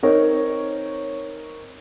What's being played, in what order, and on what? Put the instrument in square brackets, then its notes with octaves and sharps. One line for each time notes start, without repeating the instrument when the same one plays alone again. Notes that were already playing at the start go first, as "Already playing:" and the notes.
[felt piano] C4 D#4 A#4 C#5